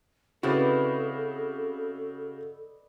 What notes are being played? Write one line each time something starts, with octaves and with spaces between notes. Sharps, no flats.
C#3 C4 E4 F#4 A4 B4 D5 D#5